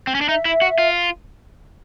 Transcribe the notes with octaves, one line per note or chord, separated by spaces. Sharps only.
C4
C#4
D4
D#4 E5
E4
F#4
F4